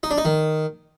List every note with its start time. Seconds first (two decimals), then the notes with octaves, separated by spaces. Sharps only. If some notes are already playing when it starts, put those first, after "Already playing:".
0.03 D#4
0.11 D4
0.18 D#4
0.25 D#3